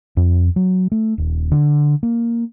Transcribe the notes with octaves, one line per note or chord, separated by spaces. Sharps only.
F2
F#3
A3
D#1
D3
A#3